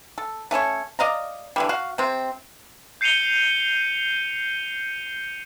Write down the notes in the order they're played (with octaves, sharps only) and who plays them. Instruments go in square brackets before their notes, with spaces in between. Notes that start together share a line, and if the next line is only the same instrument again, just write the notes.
[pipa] A4
A3 C#4 A4 C#5
D5 D#5 F5 A#5
D3 E3 G3
F#4 F5
C3 C4
[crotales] G6 C7 C#7 D#7 F7 G7